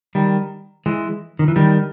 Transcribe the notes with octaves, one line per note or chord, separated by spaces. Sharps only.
D#3 G3
E3 G#3
D#3
E3
D#3 G3